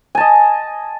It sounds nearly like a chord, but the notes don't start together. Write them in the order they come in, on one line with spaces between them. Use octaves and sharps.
G#5 A5 D#5